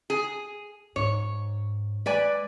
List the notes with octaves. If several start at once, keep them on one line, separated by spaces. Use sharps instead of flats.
G#4
G#2 C#5
G#3 B4 D5 G#5